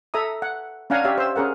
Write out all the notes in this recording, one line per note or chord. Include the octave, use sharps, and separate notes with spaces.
A4 E5 A#5 D#6
F#5
C#4 D4 F5 F#5 G#5 A#5
G4 C#5 E5 F5
C5 E6
C#4 G#4 A#4 F#5